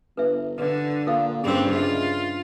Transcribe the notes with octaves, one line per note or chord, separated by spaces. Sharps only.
G1 B4 E5
G2 D3 B4 D5
A#2 A4 A#4 F5
G2 C#3 C4 G#4 E6
F4 A#4 D#5 E5